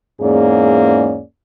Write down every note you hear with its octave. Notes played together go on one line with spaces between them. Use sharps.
E2 G#2 A#3 C#4 G#4 D5